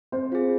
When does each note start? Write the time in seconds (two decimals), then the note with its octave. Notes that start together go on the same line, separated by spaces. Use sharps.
0.12 C4 C5
0.32 F4 G#4